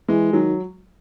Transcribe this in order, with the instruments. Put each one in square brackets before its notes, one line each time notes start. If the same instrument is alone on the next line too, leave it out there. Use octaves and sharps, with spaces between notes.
[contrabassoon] E3 [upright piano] G#3
[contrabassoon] D#3 [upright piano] F#3